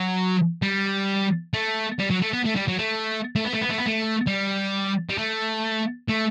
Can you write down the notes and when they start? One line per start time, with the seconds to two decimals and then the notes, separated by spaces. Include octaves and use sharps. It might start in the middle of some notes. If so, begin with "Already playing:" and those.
Already playing: F#3
0.62 G3
1.53 A3
1.99 G3
2.11 F#3
2.22 A3
2.33 B3
2.45 A3
2.56 G3
2.68 F#3
2.79 A3
3.36 A3
3.44 B3
3.53 A3
3.61 B3
3.69 A3
3.78 B3
3.86 A3
4.27 G3
5.09 G3
5.18 A3
6.09 A3